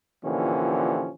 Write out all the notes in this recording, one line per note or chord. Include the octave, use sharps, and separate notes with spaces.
A#2 D3 E3 F3 C#4 G4